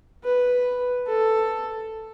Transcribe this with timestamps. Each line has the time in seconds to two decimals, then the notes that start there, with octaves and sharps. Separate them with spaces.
0.24 B4
1.07 A4